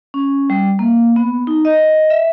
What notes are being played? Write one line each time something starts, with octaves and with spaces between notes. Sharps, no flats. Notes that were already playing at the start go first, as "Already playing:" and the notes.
C#4
G3
A#3
B3
D#4
D#5
E5